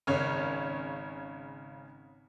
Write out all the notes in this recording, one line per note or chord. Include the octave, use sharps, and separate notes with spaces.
G#1 C#3 C#5